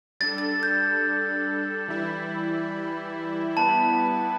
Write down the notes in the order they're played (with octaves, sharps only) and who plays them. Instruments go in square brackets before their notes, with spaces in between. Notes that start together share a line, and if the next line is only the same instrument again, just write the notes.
[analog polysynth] G3 D4 A4 [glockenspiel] A6
[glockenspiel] A6
G6
[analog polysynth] E3 G3 E4
[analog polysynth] G3 B3 E4 B4 [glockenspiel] A5